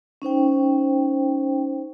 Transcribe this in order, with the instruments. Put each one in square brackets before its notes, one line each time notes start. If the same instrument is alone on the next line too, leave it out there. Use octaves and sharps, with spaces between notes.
[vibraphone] C#4 D#4 C5 G5